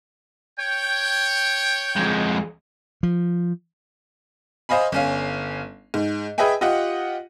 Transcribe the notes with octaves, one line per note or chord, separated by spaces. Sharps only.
C#5 G5
F2 G#3
F3
C5 D#5 F5 G#5 B5
G1 C#4 F5
G#2
G#4 B4 D#5 E5 G5 G#5
F4 G4 D#5 F#5